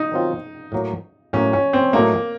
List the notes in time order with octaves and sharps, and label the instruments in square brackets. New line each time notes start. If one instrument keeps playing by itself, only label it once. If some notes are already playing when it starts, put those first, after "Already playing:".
Already playing: [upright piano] D#4
[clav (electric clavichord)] D#3 F#3 C4 F4
A2 F#3 A#3
[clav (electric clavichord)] A2 F#3 A#3 [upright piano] C#4
[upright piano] C#4
C4
[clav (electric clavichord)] A2 F#3 A3 D#4 [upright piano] A#3